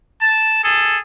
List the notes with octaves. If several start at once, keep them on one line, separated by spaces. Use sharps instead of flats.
A5
G#4 A4